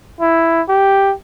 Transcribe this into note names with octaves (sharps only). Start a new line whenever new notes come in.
E4
G4